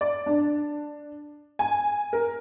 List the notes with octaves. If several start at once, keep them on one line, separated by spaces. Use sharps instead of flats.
D5
D4
G#5
A#4